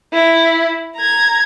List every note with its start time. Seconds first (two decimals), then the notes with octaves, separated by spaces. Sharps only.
0.13 E4
0.96 A#5 G#6